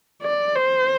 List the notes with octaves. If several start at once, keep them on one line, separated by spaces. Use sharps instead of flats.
D5
C5